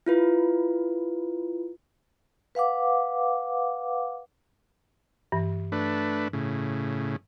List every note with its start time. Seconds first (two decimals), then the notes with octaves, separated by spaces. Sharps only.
0.06 E4 F4 B4
2.55 B4 F5 F#5 D6
5.32 G2 E3
5.72 A3 D4 B4
6.33 A2 C#3